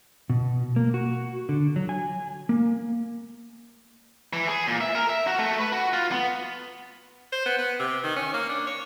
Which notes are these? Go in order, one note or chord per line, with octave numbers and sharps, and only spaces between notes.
B2
A#3
F#4
D3
F#3
G#5
A#3
E3
G#4
A#2
E5
A#4
E5
F#4
A3
B4
F#4
F4
B3
C5
B3
B3
C3
D#3
C#4
A#3
D4
C#5